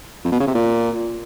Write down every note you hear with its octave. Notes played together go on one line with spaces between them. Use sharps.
F2
B2
C#3
C3
A#2